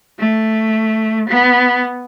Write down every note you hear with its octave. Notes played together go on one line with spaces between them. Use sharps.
A3
B3